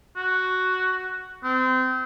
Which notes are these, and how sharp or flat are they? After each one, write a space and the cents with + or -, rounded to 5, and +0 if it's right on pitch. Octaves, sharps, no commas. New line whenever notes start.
F#4 +5
C4 -30